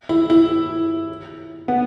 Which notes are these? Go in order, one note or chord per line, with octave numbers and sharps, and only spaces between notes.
E4
E4
B3